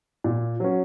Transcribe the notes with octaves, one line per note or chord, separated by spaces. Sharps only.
A#2
F#3 C#4